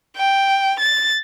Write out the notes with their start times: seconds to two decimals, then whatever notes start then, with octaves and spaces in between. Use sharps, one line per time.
0.17 G5
0.80 A6